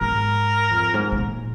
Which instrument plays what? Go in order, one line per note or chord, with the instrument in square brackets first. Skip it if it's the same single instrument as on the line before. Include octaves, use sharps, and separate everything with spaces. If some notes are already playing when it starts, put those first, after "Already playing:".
[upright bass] G#2 [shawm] A#4
[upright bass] F2
G#2
C#3
A#2